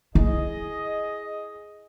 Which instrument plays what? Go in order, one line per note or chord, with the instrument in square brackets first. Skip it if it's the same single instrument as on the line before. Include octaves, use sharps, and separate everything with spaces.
[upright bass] E4 [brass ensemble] G#4 D#5